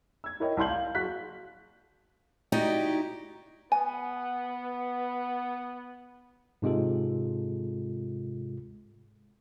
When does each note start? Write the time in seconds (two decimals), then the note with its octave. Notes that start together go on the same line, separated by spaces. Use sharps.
0.24 E6 G#6
0.40 E4 A#4 C#5 D#5 G5
0.57 C2 E4 D5 C6 G6 F#7
0.70 F5
0.95 F#1 F#4 F#6 B6
2.52 D#4 E4 F#4 G4 D5 D#5
3.72 B3 G#5
6.62 G#2 C3 G#3 F4 A4